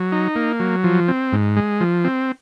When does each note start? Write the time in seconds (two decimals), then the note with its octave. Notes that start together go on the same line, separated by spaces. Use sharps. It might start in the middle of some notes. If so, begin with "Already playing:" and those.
Already playing: F#3
0.12 D#4
0.36 A#3
0.60 F#3
0.84 F3
1.08 C4
1.32 G#2
1.56 G#3
1.81 F3
2.04 C4